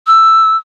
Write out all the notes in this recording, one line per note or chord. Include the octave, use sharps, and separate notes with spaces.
E6